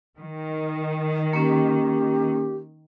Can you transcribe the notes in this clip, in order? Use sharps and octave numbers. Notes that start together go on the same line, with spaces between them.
D#3
A#3 C#4 G4